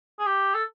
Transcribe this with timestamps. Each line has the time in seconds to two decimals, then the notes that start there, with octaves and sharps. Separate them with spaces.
0.19 G#4
0.26 G4
0.55 A4